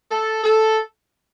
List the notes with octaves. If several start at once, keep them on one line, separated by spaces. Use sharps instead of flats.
A4
A4